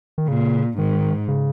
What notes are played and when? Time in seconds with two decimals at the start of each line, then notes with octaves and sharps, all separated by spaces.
0.18 D#3
0.28 A#2 C#3
0.78 G#2 D#3
1.28 C#3